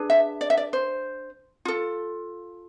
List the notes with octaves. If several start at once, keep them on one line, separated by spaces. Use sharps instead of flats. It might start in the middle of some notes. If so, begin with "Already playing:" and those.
Already playing: D4 G#4 B4
E5
D5
E5
D5
C5
F4 A4